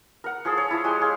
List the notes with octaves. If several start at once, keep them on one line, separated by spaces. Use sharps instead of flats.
A#4 F#5
F3 G#4 A4 E6
C#5
F3 E4
G#3 G4 C6
G#4 C#5 F5